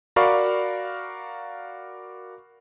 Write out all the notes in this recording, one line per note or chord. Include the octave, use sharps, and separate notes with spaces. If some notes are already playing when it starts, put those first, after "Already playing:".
F#4 A#4 D5 F5 B5 C#6